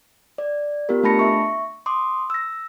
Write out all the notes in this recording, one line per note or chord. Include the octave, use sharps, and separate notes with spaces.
D5
B3 F4 G4 A#4
A3 D4 A5 B5 A#6 C#7
E5 C#6
C6 D6 D#6
E6 A#6